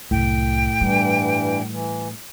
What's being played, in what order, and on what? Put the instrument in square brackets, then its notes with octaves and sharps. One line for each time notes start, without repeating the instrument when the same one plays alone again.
[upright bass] C2 F#2 [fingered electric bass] A2 [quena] G5
[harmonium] G2 E3 [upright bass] G3
[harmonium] E3